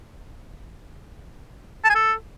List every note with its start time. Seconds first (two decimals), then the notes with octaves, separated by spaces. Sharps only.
1.84 A5
1.90 G#5
1.95 A4